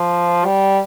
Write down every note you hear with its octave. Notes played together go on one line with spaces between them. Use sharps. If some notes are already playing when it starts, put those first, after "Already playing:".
Already playing: F3
G3